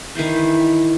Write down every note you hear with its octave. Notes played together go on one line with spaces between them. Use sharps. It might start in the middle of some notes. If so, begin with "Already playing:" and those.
D#3 E3 E4 C5